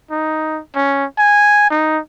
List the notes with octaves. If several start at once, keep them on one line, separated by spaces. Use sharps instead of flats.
D#4
C#4
G#5
D#4